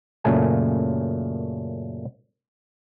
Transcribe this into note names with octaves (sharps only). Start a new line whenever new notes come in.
F#2 A#2 C#3 A3 G#5